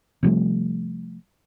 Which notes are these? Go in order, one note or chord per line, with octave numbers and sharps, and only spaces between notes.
C3 F3 G3 A3